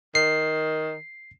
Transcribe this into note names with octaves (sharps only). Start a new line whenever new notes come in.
D#3 C7